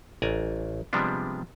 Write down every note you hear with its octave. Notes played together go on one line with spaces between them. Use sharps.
A1 D5 G#5 A#5
C3 F3 G3 G#3 B3 D4